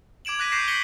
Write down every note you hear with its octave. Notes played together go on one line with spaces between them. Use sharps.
D6 G#6 D7 E7 F#7
D6 F#6 G#6 A#6 B6 D#7
C#6 G6 A#6 C7 D#7 E7
G6 A#6 B6 C#7 F#7 G7